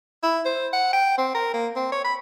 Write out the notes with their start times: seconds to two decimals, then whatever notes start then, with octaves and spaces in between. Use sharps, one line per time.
0.23 E4
0.45 C5
0.73 F#5
0.93 G5
1.18 C4
1.34 A#4
1.54 A#3
1.76 C4
1.92 C#5
2.04 B5